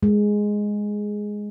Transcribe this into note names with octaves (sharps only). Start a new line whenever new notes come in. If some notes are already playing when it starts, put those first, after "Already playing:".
G#3